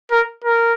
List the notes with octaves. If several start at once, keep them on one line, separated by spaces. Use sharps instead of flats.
A#4
A#4